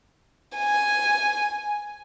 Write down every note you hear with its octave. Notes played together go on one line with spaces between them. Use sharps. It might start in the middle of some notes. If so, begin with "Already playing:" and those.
G#5